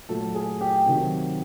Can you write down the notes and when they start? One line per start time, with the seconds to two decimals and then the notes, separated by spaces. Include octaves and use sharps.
0.09 A#2 F#3 A3 A4
0.35 G#4
0.61 G4
0.86 C3 D#3 F#3